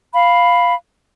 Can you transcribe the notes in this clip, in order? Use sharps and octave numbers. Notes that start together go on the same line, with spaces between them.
F5 B5